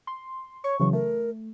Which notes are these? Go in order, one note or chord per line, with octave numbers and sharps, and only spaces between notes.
C6
C#5 C#6
C#3 E3 F#3 C#6
A3 A#4